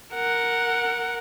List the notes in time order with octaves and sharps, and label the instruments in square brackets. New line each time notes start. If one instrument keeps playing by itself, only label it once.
[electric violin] A#4 F#5